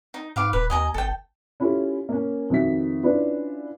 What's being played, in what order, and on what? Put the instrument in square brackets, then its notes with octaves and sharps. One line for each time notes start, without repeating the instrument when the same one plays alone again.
[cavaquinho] D#4
[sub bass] G#2 [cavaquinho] B4 F5 D6
[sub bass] D#1 [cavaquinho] B4
[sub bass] D#2 [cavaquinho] D#5 G#5 A#5
[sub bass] G#1 [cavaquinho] A4 G5
[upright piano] C#4 E4 F4 G4 A4
A#3 C#4
F2 D#3 F#4 E5 B6
C#4 D4 E4 F4 B4